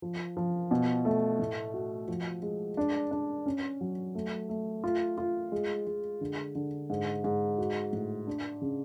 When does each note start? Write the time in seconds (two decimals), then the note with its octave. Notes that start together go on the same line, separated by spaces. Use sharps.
0.02 F3
0.37 F3
0.71 B2
1.05 A3
1.39 A2
1.74 F#4
2.08 F3
2.42 G#3
2.77 D4
3.11 D4
3.46 C#4
3.81 F#3
4.15 A3
4.49 A3
4.84 F4
5.18 F4
5.52 G#3
5.87 G#3
6.21 D3
6.55 D3
6.90 G#2
7.24 G#2
7.58 F#4
7.93 A2
8.27 D4
8.61 C#3